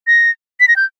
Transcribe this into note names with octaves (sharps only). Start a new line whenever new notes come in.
A#6
B6
A#6
G6